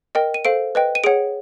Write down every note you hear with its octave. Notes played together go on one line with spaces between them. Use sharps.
A#4 D#5 G5
D#7
A4 C5 F5 D7
B4 D#5 G5
D#7
G#4 C#5 F#5 D7